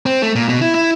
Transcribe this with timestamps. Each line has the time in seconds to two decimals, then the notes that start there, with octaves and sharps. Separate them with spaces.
0.06 C4
0.22 A3
0.35 A#2
0.49 B2
0.62 E4
0.75 E4